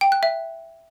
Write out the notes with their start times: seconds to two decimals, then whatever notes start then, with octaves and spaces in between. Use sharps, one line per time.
0.01 G5
0.12 F#6
0.23 E5